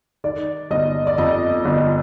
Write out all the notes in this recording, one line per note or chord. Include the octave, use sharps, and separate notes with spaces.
D#3 D5
G1 D#5
D5
F2 D#5
G1